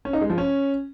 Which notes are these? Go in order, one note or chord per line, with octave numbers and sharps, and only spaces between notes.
C#4
D#4
G#3
F3
C#4